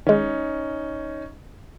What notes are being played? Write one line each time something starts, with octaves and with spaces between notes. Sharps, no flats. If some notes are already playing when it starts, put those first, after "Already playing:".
D#3 G#3 C#4 D#4